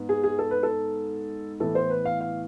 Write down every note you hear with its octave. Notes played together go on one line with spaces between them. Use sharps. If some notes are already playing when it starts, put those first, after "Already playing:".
Already playing: G#2 B3
G#4
G#4
A4
B4
A4
A2 E3 B3 E4 A4
C5
B4
F5
F5